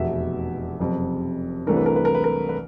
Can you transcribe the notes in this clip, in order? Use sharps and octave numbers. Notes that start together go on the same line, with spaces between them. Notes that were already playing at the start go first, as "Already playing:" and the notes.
Already playing: F1 E2 B2 E5
F#1 F2 C3
C2 C3 E3 A3 D4 A#4
B4
A#4
B4
A#4
B4
A#4
B4